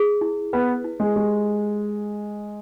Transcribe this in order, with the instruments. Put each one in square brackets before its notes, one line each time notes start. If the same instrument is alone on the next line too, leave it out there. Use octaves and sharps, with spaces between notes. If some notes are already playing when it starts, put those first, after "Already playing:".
Already playing: [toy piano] G#4
E4
[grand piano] B3 [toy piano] B4
[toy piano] E4
[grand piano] G#3
[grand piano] G#3 [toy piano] G4